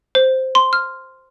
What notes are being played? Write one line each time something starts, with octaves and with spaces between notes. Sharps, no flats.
C5
C6
F6